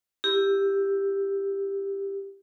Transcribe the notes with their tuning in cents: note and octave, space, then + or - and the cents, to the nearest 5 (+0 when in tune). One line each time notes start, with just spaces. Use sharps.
E4 +0 G4 +10